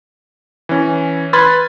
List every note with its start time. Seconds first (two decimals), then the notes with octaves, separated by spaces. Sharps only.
0.69 E3 C#4
1.33 B4 B5 C6 F6 G#6 A6